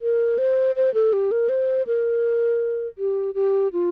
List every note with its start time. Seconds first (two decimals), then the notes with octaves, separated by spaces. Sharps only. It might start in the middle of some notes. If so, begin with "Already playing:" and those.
0.02 A#4
0.38 C5
0.76 C5
0.94 A4
1.13 G4
1.31 A#4
1.49 C5
1.87 A#4
2.98 G4
3.35 G4
3.73 F4